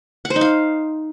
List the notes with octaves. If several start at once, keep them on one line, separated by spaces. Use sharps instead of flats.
F#5
C5
D#4
F5